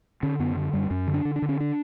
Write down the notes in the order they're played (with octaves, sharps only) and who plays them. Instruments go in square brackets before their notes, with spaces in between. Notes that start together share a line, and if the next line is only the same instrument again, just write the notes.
[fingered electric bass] D3 C#4
F#2 B3
D3
F#2 G3
F#2 C#4
D3
D4
D3
D4
D3
C#4
D4